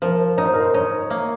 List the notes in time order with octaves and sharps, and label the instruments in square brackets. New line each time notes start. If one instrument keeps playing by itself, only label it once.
[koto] F3 [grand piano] A#4
[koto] D#4 [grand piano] C#5
[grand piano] C5
A#4
C5
[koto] D#4 [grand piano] C#5
[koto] A#3